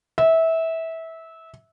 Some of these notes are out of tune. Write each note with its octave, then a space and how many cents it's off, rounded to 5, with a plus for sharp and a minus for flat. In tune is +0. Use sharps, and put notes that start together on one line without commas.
E5 -20